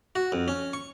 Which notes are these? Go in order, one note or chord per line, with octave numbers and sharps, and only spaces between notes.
F#4
F2
C#4
C#6